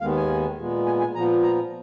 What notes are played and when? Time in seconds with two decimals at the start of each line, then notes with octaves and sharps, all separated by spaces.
0.01 D#2 D#3 G#3 B3 F5
0.16 G#5
0.58 A#2 G#3 B3
0.86 G#5
1.00 G#5
1.15 A#2 F3 B3 A#5
1.43 A#5